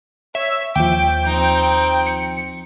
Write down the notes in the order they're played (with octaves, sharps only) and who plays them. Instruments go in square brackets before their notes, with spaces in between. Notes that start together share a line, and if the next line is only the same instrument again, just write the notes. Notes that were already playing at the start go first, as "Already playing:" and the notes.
[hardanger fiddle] C#5 [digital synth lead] E5
[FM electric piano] D#2 F3 [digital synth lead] G5 [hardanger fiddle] D6
[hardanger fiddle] C4 D#4
[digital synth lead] C#7